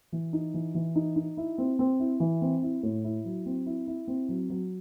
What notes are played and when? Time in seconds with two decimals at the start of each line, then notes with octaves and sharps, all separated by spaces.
0.12 E3
0.33 D#4
0.54 E3
0.75 E3
0.96 D#4
1.16 D#4
1.37 E4
1.58 C4
1.79 C4
2.00 E4
2.20 E3
2.42 C4
2.62 E4
2.83 A2
3.04 E4
3.25 F#3
3.46 C4
3.66 E4
3.87 E4
4.08 C4
4.29 F#3
4.50 F#3